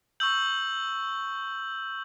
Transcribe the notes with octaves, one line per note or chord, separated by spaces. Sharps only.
C#6 E6 G6 F#7